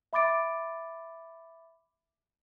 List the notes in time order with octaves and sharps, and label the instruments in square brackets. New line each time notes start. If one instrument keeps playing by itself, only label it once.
[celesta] E5 B5 D6 A6 D7